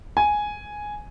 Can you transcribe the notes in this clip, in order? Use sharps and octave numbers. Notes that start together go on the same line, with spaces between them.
G#5